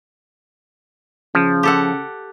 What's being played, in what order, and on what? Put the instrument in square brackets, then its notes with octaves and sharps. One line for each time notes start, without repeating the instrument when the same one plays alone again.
[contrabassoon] C#3 [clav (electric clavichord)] F3
[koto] G4 A4 F#5